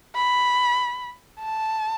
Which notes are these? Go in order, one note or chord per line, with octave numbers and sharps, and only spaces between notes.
B5
A5